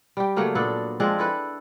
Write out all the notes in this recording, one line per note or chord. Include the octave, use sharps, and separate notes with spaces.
G3 G4
C#3 F#3 A3 A#3
A#2 B3 D4 A4
F3 G#3 C4 D4
E4 A4 B4